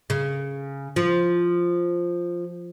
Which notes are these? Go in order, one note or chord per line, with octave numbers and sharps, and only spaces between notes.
C#3
F3